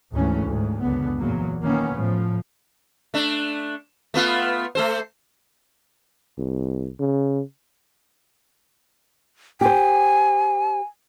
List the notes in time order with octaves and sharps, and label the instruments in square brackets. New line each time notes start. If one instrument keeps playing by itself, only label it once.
[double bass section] G#1 D2 G#2 E3 A3 C#4
D2 G#2
C#2 F#2 D3 B3
E2 A#2 F#3 A#3
D#3 A#3 B3 C#4
A2 F3
[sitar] A3 D4
A3 B3 F4
A3 A4 C5
[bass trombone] C2
C#3
[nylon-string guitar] G4 C5 [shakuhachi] G#5